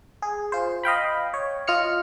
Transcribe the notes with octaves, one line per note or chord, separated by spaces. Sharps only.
G#4
F4 C5
D#5 F5 G5 B5
C#5
F4 D#5 F6 C#7